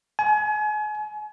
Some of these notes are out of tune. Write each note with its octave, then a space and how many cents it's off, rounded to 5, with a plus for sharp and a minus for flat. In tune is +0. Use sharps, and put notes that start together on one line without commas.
G#5 +35